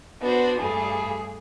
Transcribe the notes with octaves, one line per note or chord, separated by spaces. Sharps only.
B3 D4 F#4 C5
G2 G3 A3 G#4